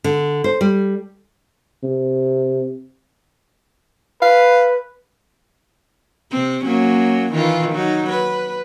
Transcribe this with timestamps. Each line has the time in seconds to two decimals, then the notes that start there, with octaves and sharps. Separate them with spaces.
0.04 D3
0.44 C5
0.61 G3
1.84 C3
4.22 B4 F5
6.31 C3 C4
6.64 F#3 A#3 C#4
7.33 D#3 E3 F4
7.72 F#3 D#4
8.09 B4